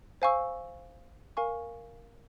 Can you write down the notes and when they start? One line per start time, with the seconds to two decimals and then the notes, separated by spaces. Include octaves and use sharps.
0.22 C5 F5 G#5 C#6 E6
1.37 A#4 F5 G#5 C#6